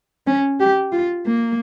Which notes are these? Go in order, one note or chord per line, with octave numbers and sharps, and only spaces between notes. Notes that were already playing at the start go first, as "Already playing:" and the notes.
C#4
G4
F4
A#3